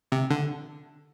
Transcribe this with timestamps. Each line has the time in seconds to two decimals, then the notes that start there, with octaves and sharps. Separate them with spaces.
0.12 C3
0.31 D3